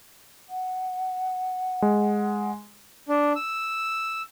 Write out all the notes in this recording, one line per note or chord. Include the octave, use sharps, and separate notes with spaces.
F#5
G#3
D4
E6